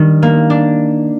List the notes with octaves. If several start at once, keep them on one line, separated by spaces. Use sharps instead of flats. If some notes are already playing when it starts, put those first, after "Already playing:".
Already playing: D#3 G3 D4
A#3
D4